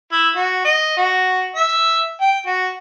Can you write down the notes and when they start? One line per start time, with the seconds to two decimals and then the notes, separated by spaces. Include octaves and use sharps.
0.12 E4
0.36 F#4
0.65 D#5
0.97 F#4
1.55 E5
2.21 G5
2.47 F#4